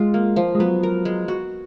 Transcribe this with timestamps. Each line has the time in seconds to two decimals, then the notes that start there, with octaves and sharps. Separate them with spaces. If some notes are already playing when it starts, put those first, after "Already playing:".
Already playing: G#3 F4
0.14 A#3
0.36 F3
0.55 G#3
0.59 F#3 B3
0.83 A#4
1.05 G#3
1.28 F#4